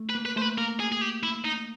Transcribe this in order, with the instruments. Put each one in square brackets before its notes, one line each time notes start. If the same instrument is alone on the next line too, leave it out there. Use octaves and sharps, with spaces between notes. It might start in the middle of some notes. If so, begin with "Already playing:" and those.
Already playing: [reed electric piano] A3
[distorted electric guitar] B4
[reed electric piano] A#3
[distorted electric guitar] B4
[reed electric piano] A3 [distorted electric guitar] C5
[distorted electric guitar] B4
[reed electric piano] A#3 [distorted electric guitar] A#4
[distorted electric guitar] G#4
G#4
G4
E4
D#4